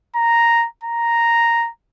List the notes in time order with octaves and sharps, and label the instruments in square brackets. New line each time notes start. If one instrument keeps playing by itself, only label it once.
[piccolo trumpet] A#5
A#5